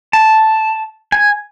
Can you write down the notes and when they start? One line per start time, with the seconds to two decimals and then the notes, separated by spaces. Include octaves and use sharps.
0.13 A5
1.12 G#5